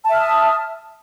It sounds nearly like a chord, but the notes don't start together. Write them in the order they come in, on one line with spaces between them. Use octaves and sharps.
A5 E5 F6 D#6